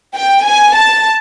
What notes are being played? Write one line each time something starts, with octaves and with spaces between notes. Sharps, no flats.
G5
G#5
A5